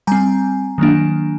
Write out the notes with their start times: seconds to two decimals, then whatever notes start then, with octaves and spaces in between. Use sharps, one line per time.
0.07 G3 C4 G#5 A#5
0.78 D#3 F#3 A#3 D4